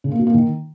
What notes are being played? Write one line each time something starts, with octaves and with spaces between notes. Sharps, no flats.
C#3
A#3
B2
A#3
D#3